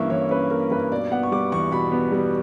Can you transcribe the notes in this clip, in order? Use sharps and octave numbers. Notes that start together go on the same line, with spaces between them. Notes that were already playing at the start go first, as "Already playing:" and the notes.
Already playing: G2 E3 A#3 C#4 E5 C#6
E3 C#5
C#4 B4
A#3 A#4
G2 B4
B2 D5
B3 F#5
C#6
G3 D6
E2 C#6
B2 B5
B3
G3